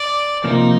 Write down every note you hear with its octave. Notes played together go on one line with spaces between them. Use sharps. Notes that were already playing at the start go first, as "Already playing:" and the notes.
Already playing: D5
C3 F3 A#3 D#4